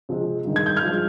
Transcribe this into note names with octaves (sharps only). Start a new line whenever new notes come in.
C3 F3 G#3
G2 D#3 G#3
G#6
G6
F6 G#6
G2 F3 G#3